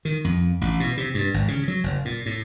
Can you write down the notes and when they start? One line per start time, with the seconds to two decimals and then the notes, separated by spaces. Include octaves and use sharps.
0.05 D#3
0.24 F2
0.61 A1
0.80 B2
0.97 C3
1.14 G2
1.34 G#1
1.48 C#3
1.68 F#3
1.84 F#1
2.05 A#2
2.26 A2